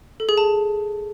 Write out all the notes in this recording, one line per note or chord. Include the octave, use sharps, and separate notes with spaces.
A4
G#4
A5